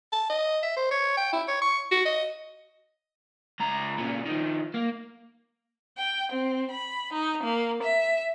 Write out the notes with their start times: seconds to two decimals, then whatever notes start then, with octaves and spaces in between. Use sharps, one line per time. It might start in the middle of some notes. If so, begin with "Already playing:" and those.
0.13 A5
0.30 D#5
0.63 E5
0.76 C5
0.91 C#5
1.17 G5
1.33 E4
1.48 C#5
1.62 C#6
1.91 F#4
2.06 D#5
3.60 C#2 A#5
3.98 A#2 C#3
4.26 D#3 F3
4.74 A#3
5.99 G5
6.33 C4
6.71 B5
7.13 D#4
7.45 A#3
7.83 E5